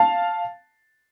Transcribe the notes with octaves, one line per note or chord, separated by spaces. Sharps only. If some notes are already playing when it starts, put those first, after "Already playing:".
Already playing: F5 A5